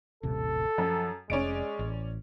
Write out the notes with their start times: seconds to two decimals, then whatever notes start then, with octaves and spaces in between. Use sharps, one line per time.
0.23 D#1 A1 C3 A4
0.78 F#2 F3
1.30 F1 G#3 C#4 D5 D7
1.79 A1